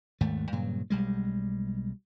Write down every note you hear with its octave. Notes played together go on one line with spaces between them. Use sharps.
G#1 D#2 G#2 A3
G2 A#2 C#3 F#3
B1 G3 G#3